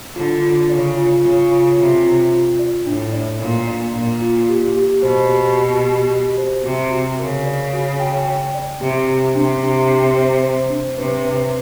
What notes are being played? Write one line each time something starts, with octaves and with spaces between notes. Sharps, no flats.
D3 F4
F4
C#3 D5
F4
C#3 F4
F4
C3 F4
F4
F4
D5
A2 D4
D5
A#2 D4
D5
A#2 D5
F4
G4
G4
B2 C5
G4
G4
G4
G4
C5
C3 F#4
F#4
C#3 A#4
D5
F#4
G5
G5
D5
C3 G4
G4
C3 D4
G4
G4
C5
C5
D4
C3 B4
B4